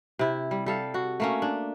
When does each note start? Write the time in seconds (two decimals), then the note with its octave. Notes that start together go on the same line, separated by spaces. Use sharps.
0.19 C3 E4
0.51 G3
0.66 G3 A4 F5
0.94 F#4
1.20 A3 A#3 C#4
1.42 D4